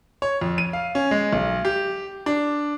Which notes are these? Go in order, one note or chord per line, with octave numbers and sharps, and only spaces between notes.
C#5
F2
D#7
F5
C#4
G#3
B1
G4
D4